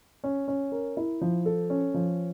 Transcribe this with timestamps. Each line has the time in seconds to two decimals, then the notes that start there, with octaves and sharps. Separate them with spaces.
0.24 C#4
0.48 C#4
0.72 A#4
0.97 E4
1.21 F3
1.46 A4
1.70 C#4
1.94 F3